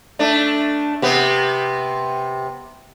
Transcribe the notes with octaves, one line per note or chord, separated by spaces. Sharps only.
A3 D4
C3 B3